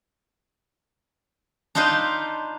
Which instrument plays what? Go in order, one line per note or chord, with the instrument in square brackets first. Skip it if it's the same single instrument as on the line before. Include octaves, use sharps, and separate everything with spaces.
[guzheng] D4 D#4 F4 B4 C5